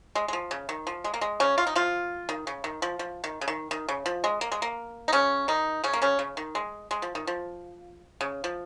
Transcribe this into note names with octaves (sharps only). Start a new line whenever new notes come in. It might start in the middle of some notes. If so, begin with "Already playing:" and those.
G#3
G#3
F3
C#3
D#3
F3
G#3
A#3
G#3
C#3 C#4
F4
D#4
F3 F4
D#3
C#3
D#3
F3
F3
D#3
C#3
D#3
D#3
C#3
F3
G#3
A#3
G#3
A#3
D#4
C#3 C#4
D#3 D#4
C#3 C#4
A#3
C#3 C#4
C#3
D#3
G#3
G#3
F3
D#3
F3
C#3
F3